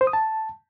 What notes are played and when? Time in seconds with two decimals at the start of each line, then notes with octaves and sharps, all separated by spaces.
0.01 C5
0.07 D#6
0.13 A5